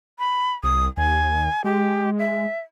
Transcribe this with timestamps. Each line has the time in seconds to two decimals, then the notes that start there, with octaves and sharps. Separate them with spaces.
0.19 B5
0.63 C2 D#6
0.97 D#2 G#5
1.64 G#3 G4
2.19 E5